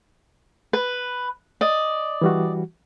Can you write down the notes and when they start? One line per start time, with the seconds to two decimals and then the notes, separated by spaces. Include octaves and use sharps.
0.73 B4
1.61 D5 D#5
2.22 E3 G3 F#4